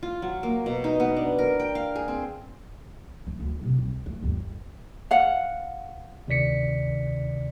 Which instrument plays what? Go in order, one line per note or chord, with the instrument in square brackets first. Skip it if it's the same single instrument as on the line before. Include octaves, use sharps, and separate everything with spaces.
[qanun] F4
F#3
A#3
B2
D#4
B3
D4
A#4
G5
F5
G#4
C4
[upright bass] A3
D2
A1 C3
C2
A3
G1 D#2
[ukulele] F5 F#5
[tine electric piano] D2 C3 D#3 D5 B6 C#7